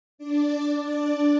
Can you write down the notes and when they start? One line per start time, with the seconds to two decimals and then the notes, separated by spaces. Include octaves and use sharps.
0.18 D4 D5